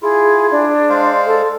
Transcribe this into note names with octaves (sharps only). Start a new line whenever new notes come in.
E4 F4 G#4
D4
G#3 C5 F5
A4